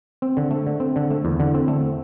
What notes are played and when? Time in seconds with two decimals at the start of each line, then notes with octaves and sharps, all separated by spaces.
0.22 C4
0.37 D3
0.51 A3
0.67 D3
0.80 C4
0.96 D3
1.11 A3
1.25 E2
1.40 D3
1.55 C4
1.68 A3